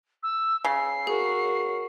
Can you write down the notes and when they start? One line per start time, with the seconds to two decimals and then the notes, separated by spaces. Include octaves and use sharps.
0.23 E6
0.65 C#3 C7
1.07 F#4 G#4 A#4